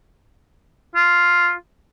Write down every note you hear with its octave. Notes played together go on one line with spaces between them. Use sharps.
F4